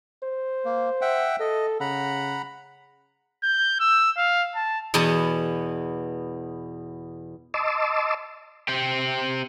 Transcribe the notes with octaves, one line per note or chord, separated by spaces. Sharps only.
C5
A#3
E5 F#5 G5
A4 D#5
C#3 F#5 A#5 B5
G6
E6
F5
A5
E2 B2 B3 A5
D#5 A5 C6 D6 E6
C4 G4